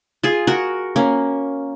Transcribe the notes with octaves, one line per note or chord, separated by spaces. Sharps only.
F4 G#4
F#4 A#4
A#3 C#4